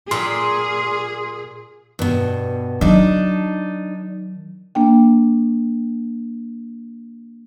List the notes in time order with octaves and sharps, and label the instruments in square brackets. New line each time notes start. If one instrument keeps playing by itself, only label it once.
[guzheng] A#2 [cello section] G#4 [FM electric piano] C6
[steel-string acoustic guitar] G2 B2
[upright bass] D#3 F#3 [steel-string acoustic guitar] D4 D#4
[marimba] A#3 D4 G5